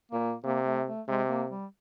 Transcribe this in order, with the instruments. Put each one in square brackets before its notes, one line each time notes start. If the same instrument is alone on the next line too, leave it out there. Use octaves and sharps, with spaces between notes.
[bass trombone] A#2 [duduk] A#3
[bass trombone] C3 [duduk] A#3
[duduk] A3
A3
[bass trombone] C3 [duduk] G#3
[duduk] A#3
G3